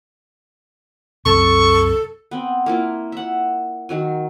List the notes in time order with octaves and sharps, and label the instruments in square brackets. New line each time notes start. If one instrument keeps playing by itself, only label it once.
[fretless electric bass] C2 F#2 C3 [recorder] A4 [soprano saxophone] C#6
[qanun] B3 C4
A#3 E4 F4
E5 F#5
D#3 F#3 G#5